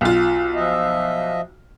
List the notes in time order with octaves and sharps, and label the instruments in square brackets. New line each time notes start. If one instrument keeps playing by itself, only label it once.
[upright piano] B1 F4
[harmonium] F3 D#5 E5